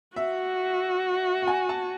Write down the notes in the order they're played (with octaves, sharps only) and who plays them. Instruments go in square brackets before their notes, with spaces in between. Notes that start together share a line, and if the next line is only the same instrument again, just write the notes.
[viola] F#4 [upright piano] E5
[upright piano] F#5
G#5
A5